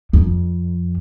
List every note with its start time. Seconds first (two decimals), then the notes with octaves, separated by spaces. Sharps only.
0.13 F2